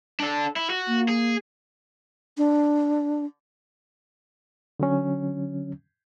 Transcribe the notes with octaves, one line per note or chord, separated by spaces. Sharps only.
D4 A4
E4
F#4
A#3
G#4
D4
D3 F#3 C#4